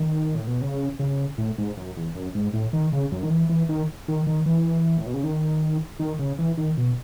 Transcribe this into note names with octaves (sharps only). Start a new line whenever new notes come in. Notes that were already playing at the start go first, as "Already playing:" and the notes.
Already playing: D#3
A2
B2
C#3
C#3
A2
G#2
F#2
E2
F#2
G#2
A2
D#3
C#3
F#2
D#3
E3
E3
D#3
D#3
D#3
E3
A2
B2
C#3
D#3
D#3
C#3
E3
D#3
B2